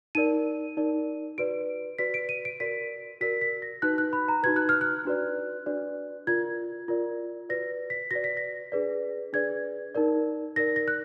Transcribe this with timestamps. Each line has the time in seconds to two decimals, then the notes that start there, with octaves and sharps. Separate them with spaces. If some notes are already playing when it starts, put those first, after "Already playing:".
0.15 D#4 A#4 D5 D#7
0.77 D#4 A#4 D5
1.38 F#4 B4 D5 D7
1.99 F#4 B4 D5 B6
2.14 D7
2.29 D#7
2.45 D7
2.60 F#4 A#4 D5 B6
3.21 F#4 A#4 D5 B6
3.41 B6
3.62 A#6
3.82 D#4 F#4 B4 F#6
3.98 F#6
4.13 B5
4.28 A#5
4.43 D#4 F#4 B4 G#6
4.56 F#6
4.69 F6
4.81 F#6
5.05 D4 F#4 B4 D5
5.66 D4 F#4 B4 D5
6.27 F4 A#4 D5 G#6
6.88 F4 A#4 D5
7.49 F#4 B4 D5 A#6
7.90 B6
8.11 F#4 B4 D5 A#6
8.24 B6
8.37 A#6
8.72 D4 G#4 B4 D5
9.33 D4 G#4 B4 D5 G#6
9.95 D#4 A#4 D5
10.56 D#4 A#4 D5 A#6
10.76 A#6
10.88 F#6